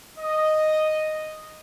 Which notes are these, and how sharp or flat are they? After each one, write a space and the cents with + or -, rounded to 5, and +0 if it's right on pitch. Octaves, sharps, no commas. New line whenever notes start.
D#5 -5